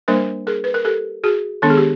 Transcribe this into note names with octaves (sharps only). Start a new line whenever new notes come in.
G3 A#3 D4 A#4 C5
G#4 A#4
B4
A#4
G4 A4
F#4 G#4
D#3 G#3 B3 D4 A4
G#4
G4